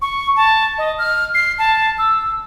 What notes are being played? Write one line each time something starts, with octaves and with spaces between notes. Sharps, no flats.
C#6
A5
D#5
F6
C7
A5
E6